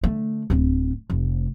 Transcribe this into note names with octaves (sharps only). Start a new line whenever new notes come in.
D3 A3
D1 C4
F1